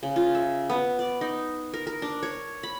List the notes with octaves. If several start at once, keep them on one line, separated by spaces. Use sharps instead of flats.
C#3
F4
E5
B3
D5
D#4
A#4
A#4
D4
C#5
B5